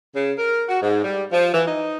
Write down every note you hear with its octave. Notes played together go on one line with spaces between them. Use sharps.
C#3
A#4
F#4
G#2
G3
F3
E3
D#4